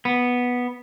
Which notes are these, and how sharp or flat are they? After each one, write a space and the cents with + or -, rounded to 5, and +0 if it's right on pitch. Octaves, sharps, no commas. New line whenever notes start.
B3 -5